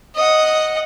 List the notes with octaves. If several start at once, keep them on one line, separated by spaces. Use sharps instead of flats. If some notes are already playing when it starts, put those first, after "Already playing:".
D#5 F#5